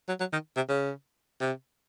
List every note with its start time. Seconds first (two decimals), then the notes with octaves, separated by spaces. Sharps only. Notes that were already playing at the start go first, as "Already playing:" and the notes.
0.08 F#3
0.20 F#3
0.32 D#3
0.57 C3
0.69 C#3
1.41 C3